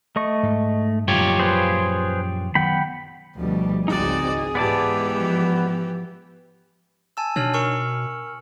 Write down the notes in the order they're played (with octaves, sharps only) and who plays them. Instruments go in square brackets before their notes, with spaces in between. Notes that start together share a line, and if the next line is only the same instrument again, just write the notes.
[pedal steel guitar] A3 D#5 C#6
[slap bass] G#2
[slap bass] F#2 A#2 F3 [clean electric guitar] F4 G4 C#5
[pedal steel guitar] G#4 B4 C5
[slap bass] D#3 F#3 B3 [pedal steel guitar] F#5 G5 B5
[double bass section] D2 B2 [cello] F3 G3
[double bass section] G#1 C#2 C4 [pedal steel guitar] D#4 D#5 [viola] F#4 D5 [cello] G#4
[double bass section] G#2 [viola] E3 G4 [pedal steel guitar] B3 D5 A5
[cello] F3
[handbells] G#5 A5 E6
[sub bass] B2 [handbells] D4 D#4 C#5 [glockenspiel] G#5 F6 F#7
[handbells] A#4 E6 [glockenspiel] G#5 C#6 C#7